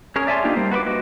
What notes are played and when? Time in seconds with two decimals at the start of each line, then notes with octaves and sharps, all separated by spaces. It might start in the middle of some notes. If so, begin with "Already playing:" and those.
0.16 C#4 G#4 A#4 C#5
0.27 D5 E5 G#5 A5 C6
0.44 A#3 D4 D#4 F4 G4
0.56 G3 A#3 C5
0.71 F#4 B4 C6 D6
0.86 F#4 B4 D#5